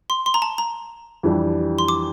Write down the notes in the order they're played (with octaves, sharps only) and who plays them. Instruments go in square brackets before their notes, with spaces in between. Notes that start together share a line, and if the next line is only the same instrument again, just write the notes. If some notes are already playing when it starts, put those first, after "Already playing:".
[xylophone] C6
C6
A#5
A5
A#5
[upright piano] F2 E3 G3 D4 G4
[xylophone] C6
D6